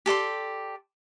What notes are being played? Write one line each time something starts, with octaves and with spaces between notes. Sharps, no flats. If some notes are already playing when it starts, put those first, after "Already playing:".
G4 A4 D5 C6